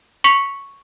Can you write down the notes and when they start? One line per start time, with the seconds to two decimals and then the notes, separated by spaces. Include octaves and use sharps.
0.24 C#6 B6 C#7 F7